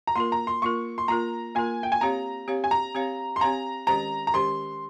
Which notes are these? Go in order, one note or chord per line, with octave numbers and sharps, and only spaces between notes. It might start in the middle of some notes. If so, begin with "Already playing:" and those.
A#5
A#3 F4 A#4 C6
A#5
C6
A#3 F4 A#4 C#6
C6
A#3 F4 A#4 A#5
A#3 F4 A#4 G#5
G5
G#5
C4 G4 C#5 F5 A#5
C4 G4 C#5 F5
G#5
A#5
C4 G4 C#5 F5
C6
C4 G4 C#5 F5 A#5
D#3 G#3 C#4 G4 C5 A#5
A#5
D#3 G#3 C#4 G4 C5 C6